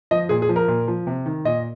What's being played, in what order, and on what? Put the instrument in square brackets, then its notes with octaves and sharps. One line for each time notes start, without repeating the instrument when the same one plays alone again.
[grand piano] F3 D#5
A#2 G#4
G#4
F3
A#4
A#2
F3
C3
D#3
A#2 D#5